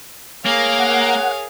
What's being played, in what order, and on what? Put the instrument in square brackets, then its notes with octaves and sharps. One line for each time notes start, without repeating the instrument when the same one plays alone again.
[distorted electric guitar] A#3 [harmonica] G#4 C#5 [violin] A#4 F5
[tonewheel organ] F#5